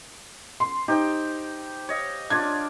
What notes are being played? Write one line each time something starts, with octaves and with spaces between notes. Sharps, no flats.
C6
D#4 G4 C5 G5
C#5 D#5 F5
D4 F4 D5 G#6